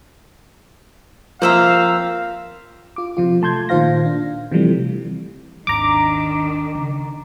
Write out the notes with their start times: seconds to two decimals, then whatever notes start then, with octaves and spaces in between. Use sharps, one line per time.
1.42 F3 A#3 C4 C5 E5 F5 A#5
2.96 F4 D6
3.17 C3 F3 F4
3.42 A3 A5 C6 G6 G#6
3.69 A#2 D#3 F4 C5 F5 A#6
4.06 D4
4.51 C3 E3 F3 G3 A3 C4
5.67 G#1 D#2 D#3 D4 A#5 D6
6.75 C#3